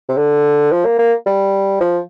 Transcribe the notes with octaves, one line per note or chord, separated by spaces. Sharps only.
C3
D3
F3
A#3
A#3
G3
F3